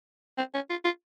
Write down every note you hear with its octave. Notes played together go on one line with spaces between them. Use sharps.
C4
C#4
F4
F4